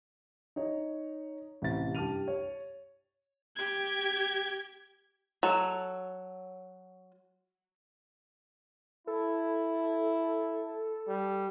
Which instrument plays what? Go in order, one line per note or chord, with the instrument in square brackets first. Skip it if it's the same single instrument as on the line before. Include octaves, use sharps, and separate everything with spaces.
[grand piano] D#4 C#5
A1 C3 A6
G2 G4 A5 F6 D#7 F7
C#5
[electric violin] G4 G#6
[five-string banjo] F#3 A4
[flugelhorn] E4 [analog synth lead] A4
[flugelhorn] G3